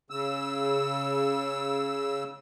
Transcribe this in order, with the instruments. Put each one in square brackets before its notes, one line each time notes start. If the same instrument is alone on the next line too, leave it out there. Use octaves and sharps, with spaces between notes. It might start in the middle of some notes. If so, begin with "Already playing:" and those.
[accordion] C#3 E6